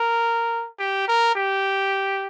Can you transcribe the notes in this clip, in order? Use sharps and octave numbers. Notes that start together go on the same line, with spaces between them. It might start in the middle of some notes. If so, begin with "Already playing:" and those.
Already playing: A#4
G4
A#4
G4